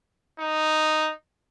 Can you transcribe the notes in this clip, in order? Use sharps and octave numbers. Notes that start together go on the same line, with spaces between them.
D#4